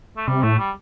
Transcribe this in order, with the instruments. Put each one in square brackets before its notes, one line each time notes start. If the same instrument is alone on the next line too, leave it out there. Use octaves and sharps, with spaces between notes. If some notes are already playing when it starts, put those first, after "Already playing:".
[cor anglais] A3
[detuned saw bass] C3 [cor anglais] G3
[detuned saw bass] A2 [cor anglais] A3
[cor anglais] G3